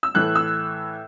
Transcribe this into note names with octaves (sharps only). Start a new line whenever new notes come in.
E6
A2 E3 A3 F#6
E6